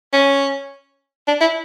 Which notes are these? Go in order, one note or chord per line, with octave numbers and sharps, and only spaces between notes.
C#4
D4
E4